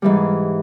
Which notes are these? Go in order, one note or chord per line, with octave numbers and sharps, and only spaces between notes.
G#2 E3 G3